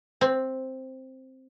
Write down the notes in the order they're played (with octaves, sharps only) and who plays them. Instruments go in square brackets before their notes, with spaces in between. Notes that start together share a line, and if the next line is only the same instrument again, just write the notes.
[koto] C4